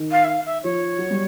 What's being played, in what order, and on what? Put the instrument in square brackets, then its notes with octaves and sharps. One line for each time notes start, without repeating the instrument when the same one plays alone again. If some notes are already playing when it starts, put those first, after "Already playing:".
Already playing: [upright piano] D#3
[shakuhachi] F5
E5
F5
E5
[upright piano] F3 [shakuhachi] C#5
[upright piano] F#3
G3